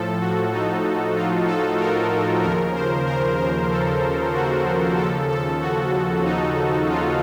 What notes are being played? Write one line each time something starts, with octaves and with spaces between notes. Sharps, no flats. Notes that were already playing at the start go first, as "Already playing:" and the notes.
Already playing: A2 F3 A4
F#4
D#4
F4
A4
A#4
D#2 C#3 F3 A#4
C5
A#4
A#4
A4
F#4
D#2 C#3 F3 A4
A4
F#4
D#4
F4